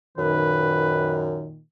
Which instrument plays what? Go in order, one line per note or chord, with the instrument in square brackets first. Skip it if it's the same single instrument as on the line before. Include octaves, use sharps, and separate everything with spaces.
[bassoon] F#2 [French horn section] A#2 D#3 [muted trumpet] B4